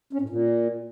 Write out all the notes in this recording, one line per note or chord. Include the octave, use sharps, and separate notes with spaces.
C#4
A2
A#2